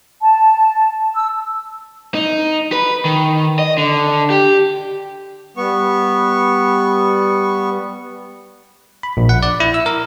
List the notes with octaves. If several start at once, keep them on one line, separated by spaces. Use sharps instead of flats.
A5
E6
D#4
B4
D#3
D#5
D3
G4
G3 B3 C#6
B5
A#1
F#5
D5
E4
E6
A#4